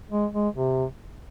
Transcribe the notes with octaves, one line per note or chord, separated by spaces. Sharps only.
G#3
G#3
C3